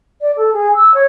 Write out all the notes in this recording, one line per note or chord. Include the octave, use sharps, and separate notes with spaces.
D5
A4
G#4
E6
C#5